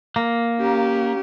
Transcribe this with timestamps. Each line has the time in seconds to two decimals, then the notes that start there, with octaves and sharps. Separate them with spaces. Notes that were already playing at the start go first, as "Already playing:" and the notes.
0.16 A#3
0.59 C#4 G4